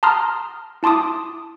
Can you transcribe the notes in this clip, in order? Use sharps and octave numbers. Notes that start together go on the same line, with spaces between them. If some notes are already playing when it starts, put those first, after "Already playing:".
A5 A#5 C6 D#6 F6
E4 A5 C6 D6 D#6